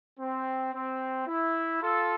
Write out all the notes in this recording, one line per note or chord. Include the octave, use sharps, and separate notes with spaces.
C4
C4
E4
F4 A4